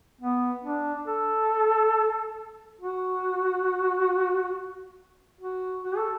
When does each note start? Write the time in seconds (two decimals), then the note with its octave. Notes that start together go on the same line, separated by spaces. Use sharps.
0.21 B3
0.64 D4
1.07 A4
2.81 F#4
5.41 F#4
5.84 F#4
5.97 A4